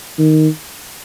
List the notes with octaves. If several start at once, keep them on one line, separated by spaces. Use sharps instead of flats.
D#3